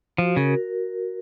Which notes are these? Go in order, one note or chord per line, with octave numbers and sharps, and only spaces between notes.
F3 F#4
C#3 A#4